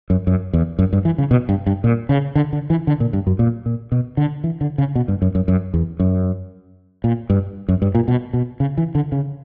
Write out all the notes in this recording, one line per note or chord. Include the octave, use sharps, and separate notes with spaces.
F#2
F#2
E2
F#2
G2
E3
C#3
B2
G2
G2
A#2
C#3
D3
D3
E3
D3
A#2
G2
F#2
A#2
A#2
B2
D3
E3
D3
C#3
B2
G2
F#2
F#2
F#2
E2
F#2
A#2
G2
F#2
G2
A#2
B2
B2
C#3
E3
D3
C#3